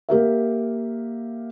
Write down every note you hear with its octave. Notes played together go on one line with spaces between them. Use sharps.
A#3 G4 A#4 E5